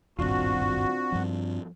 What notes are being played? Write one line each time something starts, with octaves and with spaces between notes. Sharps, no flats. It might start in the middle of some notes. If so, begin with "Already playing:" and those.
D#1 G#1 G2 C4 D4 F4 F#4
G2 F3